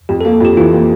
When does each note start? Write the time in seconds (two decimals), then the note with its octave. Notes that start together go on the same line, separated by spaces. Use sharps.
0.09 F2 G4
0.21 A4
0.25 A#3
0.33 A4
0.41 F2 G4
0.57 E3 F4
0.73 A#3